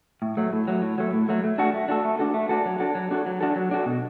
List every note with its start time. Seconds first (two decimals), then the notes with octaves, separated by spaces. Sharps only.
0.22 A2
0.37 F#3 A3
0.53 A2
0.68 F#3 A3
0.82 A2
0.98 F#3 A3
1.13 A2
1.29 F#3 A3
1.44 A3
1.58 D4 F#4 A4
1.74 A3
1.88 D4 F#4 A4
2.05 A3
2.19 D4 F#4 A4
2.34 A3
2.49 D4 F#4 A4
2.66 F#3
2.80 D4 F#4 A4
2.95 F#3
3.11 D4 F#4 A4
3.26 F#3
3.41 D4 F#4 A4
3.56 F#3
3.71 D4 F#4 A4
3.86 B2